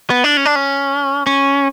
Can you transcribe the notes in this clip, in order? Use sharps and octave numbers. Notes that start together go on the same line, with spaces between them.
B3
D4
C#4
D4
C#4
C#4